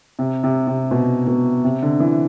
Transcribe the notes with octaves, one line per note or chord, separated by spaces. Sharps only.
C3
C3
C3
B2
B2
C3
D3
E3